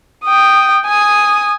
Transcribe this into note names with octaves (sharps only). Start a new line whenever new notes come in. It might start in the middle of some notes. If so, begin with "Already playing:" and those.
G5 D#6
G#5 D#6